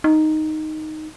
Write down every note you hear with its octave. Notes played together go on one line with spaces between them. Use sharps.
D#4